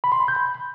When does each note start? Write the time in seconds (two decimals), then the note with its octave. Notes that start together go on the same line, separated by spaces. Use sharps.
0.04 B5
0.12 C6
0.20 B5
0.28 G6
0.36 B5